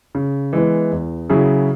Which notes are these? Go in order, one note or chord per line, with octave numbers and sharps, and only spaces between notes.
C#3
E3 G#3 B3
E2
C#3 F#3 E4 G#4